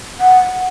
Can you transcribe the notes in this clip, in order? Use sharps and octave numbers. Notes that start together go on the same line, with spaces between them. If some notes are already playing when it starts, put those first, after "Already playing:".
F#5